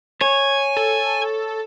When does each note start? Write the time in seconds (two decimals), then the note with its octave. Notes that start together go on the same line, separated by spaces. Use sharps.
0.21 C#5 G#5
0.77 A4